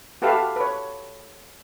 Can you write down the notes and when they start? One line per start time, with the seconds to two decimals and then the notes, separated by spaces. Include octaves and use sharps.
0.22 F#4 G4 A4 B4 E5 F5
0.56 B4 C#5